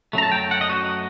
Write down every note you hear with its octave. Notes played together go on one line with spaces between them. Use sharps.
F#2 F#3 A3 A#5
A5
G5
F#5
D#5
F#4